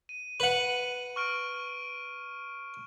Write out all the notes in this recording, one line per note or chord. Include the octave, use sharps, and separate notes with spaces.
D#7
B4 F#5 D#7
C#6 F6 D7